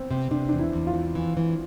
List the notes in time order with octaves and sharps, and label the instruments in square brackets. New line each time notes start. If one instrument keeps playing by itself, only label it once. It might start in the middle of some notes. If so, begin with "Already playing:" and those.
Already playing: [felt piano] B3 C4
[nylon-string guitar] C3
[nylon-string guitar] C3 [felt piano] D4
[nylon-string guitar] E2 [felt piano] D4
[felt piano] E4
[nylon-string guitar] E2
[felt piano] F4
[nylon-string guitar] E2
E3
E3